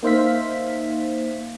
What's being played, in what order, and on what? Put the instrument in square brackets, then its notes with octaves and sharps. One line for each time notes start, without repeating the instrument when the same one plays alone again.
[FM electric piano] A#3 D#4 C5 E5 F5 B6